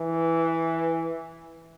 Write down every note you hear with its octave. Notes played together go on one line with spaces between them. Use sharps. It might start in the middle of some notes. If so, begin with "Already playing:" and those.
Already playing: E3